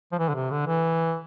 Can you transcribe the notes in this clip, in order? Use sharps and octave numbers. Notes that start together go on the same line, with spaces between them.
F3
E3
D3
C3
D3
E3